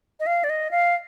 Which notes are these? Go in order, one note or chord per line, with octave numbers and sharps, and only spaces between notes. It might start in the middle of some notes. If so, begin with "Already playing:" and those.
D#5
F5
D5
D#5
F5